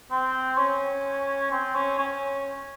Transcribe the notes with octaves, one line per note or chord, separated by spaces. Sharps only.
C4
C#4
C4
C#4
C#4